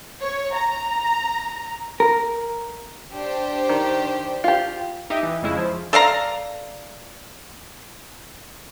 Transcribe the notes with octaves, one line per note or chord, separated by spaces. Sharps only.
C#5
A#5
A#4
D4 G4 C5
D#3
F4 G4
D#4 G4 D#5 E5
E3
F2 C#3 G#3 E4
F3
A4 D5 F5 A#5